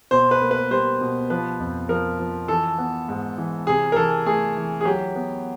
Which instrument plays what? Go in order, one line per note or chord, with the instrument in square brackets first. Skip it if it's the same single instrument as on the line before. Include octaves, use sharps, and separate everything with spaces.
[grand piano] B2 C5
B4
A#3
B4
G3 C5
B2
F3 B4
F2
F3 A#4
F3
E3 A4
B3
G#2
E3
C3 G#4
A#4
E3 A4
A3 G#4
E3
G#4
F#3 G4
B3